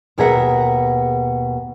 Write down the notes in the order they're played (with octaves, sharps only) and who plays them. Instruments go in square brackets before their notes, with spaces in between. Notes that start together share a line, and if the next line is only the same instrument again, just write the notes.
[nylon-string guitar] D#2 B2 G#4 A#4 E5 F#5